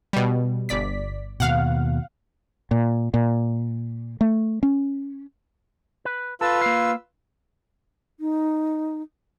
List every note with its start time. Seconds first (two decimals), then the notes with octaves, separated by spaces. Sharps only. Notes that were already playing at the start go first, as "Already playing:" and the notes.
0.13 B2 G3
0.69 G1 D5 B6
1.40 D#2 B2 F5 F#5
2.71 A#2
3.14 A#2
4.21 A3
4.63 C#4
6.05 B4
6.41 F4 A4 B4 E6
6.61 A#3 F5
8.20 D#4